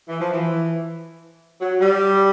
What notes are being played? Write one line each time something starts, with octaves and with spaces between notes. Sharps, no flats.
E3
F3
E3
F#3
G3